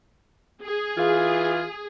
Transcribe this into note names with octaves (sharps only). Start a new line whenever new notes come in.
G#4
E3 F4